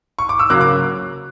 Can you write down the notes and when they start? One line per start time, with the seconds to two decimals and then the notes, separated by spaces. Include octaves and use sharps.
0.19 C#6
0.29 D6
0.39 E6
0.50 C#3 F#3 A#3 D6 F#6
0.61 D6